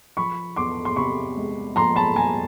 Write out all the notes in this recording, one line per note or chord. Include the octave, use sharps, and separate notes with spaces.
F3 B5 C#6
E2 C6 D6
C6
C3 B5 C#6
G#3
F3 A#5 C6
A5 B5
E2 G#5 A#5